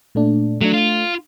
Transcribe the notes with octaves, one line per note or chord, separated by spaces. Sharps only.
A#2 A3 D4
F#3 A3 D4
F4